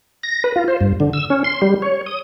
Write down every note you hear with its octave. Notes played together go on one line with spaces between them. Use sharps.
A#6
B4
F4
C5
G2
D3
E6
C#4
C6
G3
C#5
D#6